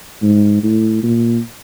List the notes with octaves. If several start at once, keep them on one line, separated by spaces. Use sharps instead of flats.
G#2
A2
A#2